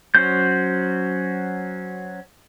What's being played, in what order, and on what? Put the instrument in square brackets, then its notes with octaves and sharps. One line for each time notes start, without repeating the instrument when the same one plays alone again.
[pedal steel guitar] F#3 C#4 F#4 C5 G6